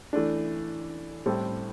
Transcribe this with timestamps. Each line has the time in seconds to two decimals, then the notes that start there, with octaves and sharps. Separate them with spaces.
0.13 E3 A3 D4
1.26 A2 G3 C4 E4 A4